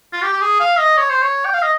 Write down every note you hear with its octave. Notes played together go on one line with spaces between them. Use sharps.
F4
G4
G4
G#4
F5
D#5
C#5
C5
C#5
G5
F5
D#5